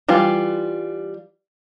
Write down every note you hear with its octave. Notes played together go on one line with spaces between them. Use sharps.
E3 G3 F4